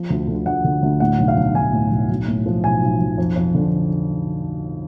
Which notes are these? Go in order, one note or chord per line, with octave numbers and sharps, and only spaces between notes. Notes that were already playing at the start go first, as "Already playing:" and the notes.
Already playing: F3
D2
D3
D2 F#5
D3
D2
A2 F#5
B1
F5
B1
B1 G#5
A2
B1
B1
A2
F3
B1 G#5
B1
B1
F2
F2
D3